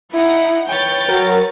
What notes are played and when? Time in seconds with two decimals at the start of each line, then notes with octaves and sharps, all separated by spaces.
0.12 D#4 E4 F#5
0.68 B4 C#5 G5 A6
1.09 F#3 A#4